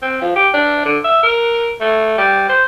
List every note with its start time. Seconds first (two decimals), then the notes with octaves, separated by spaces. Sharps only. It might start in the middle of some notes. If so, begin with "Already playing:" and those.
0.02 C4
0.22 F3
0.36 G4
0.54 D4
0.85 D3
1.04 E5
1.23 A#4
1.81 A3
2.18 G3
2.49 C5